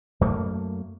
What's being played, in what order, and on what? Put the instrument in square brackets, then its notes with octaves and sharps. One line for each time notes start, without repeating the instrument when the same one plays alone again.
[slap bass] F#2 A3 A#3